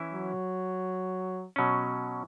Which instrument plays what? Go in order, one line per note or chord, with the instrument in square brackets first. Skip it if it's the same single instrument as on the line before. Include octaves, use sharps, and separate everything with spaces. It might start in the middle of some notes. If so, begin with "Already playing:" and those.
Already playing: [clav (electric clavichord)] E3 C#4 E4
[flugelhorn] F#3
[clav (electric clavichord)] B2 F#3 C#4